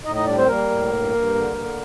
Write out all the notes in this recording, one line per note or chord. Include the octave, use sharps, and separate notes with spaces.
A2 D#4 D#5
D#4 D#5
G3 D4 D5
C4 C5
G3 A#3 A#4
A2
G2
G2
D3
D3